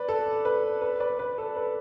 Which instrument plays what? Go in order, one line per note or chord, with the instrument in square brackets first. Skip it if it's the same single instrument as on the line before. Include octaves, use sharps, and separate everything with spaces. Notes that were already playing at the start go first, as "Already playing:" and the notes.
Already playing: [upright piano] B4 D5
A4
B4
B4
B4 D5
B4
A4
B4